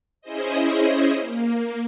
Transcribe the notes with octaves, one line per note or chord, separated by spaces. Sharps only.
C#4 E4 G#4 C5 D#5
A#3